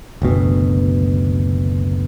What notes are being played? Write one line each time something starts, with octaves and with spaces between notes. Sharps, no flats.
F#1 D2 B2